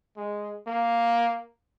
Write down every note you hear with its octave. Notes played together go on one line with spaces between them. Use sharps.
G#3
A#3